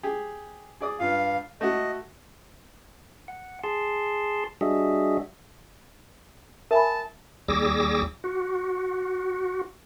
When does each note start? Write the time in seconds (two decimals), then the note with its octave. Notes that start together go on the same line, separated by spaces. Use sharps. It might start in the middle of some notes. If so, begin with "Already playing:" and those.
0.03 G4 G#4
0.81 G#4 D5 D#6
1.00 G2 F4 F5
1.61 A3 F#4 D#5
3.28 F#5
3.64 G#4 A5 C6
4.61 G3 D4 F#4 G#4 D#5 E5
6.71 A#4 E5 G#5 A5 B5
7.48 D#2 G3 G#4 D6 E6 A#6
8.24 F#4